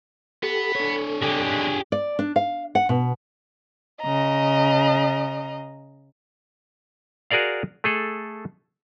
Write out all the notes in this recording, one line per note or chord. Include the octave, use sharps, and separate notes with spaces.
B3 G4 A4
D4 A4 C#5
B1 D3 G4 G#4
D5
D4
F5
F#5
B2
C#3 D#5 A#5
F#4 G#4 A#4 D5 F5
A3 G#4 A4